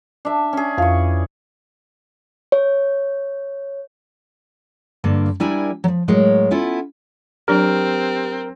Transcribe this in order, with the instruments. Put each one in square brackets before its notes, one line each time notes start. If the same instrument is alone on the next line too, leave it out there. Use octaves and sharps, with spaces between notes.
[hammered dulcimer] D4 E5
C#4 G#4
[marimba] F2 F5 [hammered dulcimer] E3 C#6
[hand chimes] C#5
[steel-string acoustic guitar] G2 D3 A#3
G3 D4 E4 A#4 G#5
F3 F#3
A2 F#3 G#3 A#4 C#5
B3 C#4 E4 F4 A4
[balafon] F#3 D4 D5 [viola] C4 [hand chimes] G4 [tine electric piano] A#4